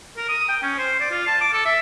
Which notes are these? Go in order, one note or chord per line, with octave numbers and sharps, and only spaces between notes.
A#4
D#6
G5
C#4
C5
D5
F4
A5
D6
A4
E5